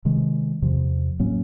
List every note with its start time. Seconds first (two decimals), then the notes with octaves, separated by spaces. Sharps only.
0.05 C3 D#3 G#3
0.62 E2 C3 F3
1.20 A2 F#3 A#3 C#4